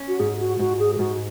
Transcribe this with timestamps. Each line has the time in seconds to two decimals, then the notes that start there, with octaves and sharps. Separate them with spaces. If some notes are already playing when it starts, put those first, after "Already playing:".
Already playing: C#4
0.08 F#4
0.19 G#2 G#4
0.39 F#4
0.59 G#2 F#4
0.79 G#4
0.95 G#4
0.99 G#2 F#4